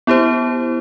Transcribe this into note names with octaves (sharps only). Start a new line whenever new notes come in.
B3 E4 G4 C5